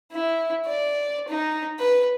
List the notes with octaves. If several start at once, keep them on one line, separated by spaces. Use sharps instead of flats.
E4
D5
D#4
B4